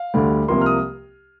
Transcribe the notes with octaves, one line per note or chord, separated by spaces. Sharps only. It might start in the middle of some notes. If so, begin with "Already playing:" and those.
Already playing: F5
D2 D3 G3
C2 C3 F3 A#3 C6
F6
D#6